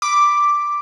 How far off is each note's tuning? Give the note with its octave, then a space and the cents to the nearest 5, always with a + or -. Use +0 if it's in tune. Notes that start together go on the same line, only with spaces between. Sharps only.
B5 +0 D6 +0